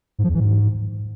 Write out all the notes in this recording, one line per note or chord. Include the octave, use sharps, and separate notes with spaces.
G#2
F3
E2
E3
G#2